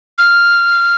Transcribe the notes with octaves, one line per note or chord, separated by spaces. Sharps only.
F6